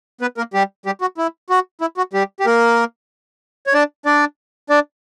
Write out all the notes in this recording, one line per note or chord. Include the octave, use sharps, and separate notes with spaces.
B3 B4
A#3 A#4
G3 G4
G3 G4
F#4
E4
F#4
E4
F#4
G3 G4
G4
A#3 A#4
C#5
D4 D5
D4 D5
D4 D5